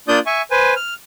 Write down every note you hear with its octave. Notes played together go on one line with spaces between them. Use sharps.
A#3 D4 F4 D5 D#6 G6
E5 G#5 C#6
B4 C5 G#5
F6